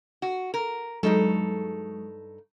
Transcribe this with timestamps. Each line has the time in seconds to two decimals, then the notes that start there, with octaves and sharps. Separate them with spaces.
0.22 F#4
0.54 A#4
1.03 G2 F#3 G#3 D#4 A4